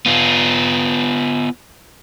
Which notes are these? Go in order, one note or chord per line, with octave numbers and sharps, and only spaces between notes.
B3 F4